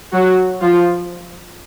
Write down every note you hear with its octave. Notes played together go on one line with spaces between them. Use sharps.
F#3 F#4
F3 F4